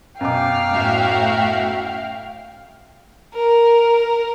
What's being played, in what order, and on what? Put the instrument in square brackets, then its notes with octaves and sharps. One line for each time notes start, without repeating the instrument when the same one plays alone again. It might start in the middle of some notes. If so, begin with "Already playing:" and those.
[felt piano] F#2 B2 D6 [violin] F5 [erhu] G5
[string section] A2 F#4 E5
[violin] A#4